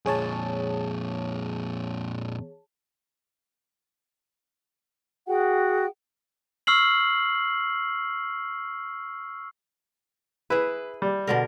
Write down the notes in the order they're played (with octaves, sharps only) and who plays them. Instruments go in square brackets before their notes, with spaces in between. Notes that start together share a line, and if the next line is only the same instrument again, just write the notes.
[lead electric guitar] F2 A#2 [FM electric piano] G#4 C#5 A5
[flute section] F#4 G#4 F#5 G5
[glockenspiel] C#6 E6 F6 C7 F#7
[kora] E4 G#4 [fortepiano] B4
[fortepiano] G3
[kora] B2 D3 A#4